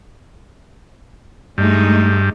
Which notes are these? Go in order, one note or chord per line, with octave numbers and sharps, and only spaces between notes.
G2 G#3 A3 D#4